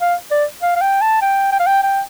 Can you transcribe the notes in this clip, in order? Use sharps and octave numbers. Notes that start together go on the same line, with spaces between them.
F5
D5
F5
F5
G5
A5
G5
G5
F5
G5
G5